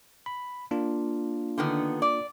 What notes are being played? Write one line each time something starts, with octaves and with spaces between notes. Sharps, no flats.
B5
A#3 D4 F4
D3 D#3 B3
D5